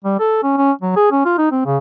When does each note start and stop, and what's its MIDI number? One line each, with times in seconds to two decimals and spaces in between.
0.04 0.16 55
0.20 0.38 69
0.43 0.53 61
0.57 0.72 61
0.81 0.94 54
0.96 1.07 68
1.11 1.22 61
1.25 1.33 65
1.38 1.51 63
1.52 1.61 60
1.65 1.78 49